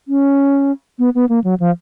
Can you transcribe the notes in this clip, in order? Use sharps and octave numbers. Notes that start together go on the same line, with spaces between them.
C#4
B3
B3
A#3
F#3
F3